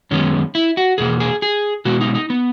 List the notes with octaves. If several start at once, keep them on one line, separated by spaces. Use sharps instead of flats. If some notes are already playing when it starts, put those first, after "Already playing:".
F#2 D#3 G#3 B3 C#4
E4
F#4
E2 B2 A#3 G#4
G#4
G#4
B2 G#3 B3 F#4
D#4
D#4
B3